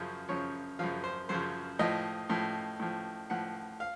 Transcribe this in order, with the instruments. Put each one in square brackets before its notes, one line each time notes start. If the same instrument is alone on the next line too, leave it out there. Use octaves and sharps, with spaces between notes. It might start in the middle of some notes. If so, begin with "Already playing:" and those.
Already playing: [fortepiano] F#2 C#3 F3 C5
F#2 C#3 F3 C#5
F#2 C#3 F3 F5
C5
F#2 C#3 F3 C5
A2 F3 D#5
A2 F3
A2 F3
A2 F3 F#5
F5